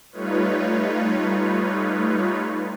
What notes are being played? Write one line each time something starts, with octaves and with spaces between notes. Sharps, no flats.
G3 A3 D#4 F4 B4 C#5